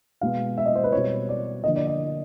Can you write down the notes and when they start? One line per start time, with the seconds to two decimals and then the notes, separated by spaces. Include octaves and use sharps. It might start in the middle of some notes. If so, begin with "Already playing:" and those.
0.21 B2 G#3 B3 F5
0.58 E5
0.66 D#5
0.75 C5
0.84 B4
0.92 B2 G3 C4 C#5
1.29 D5
1.64 D3 F3 A#3 D#5
1.76 D5
1.87 D#5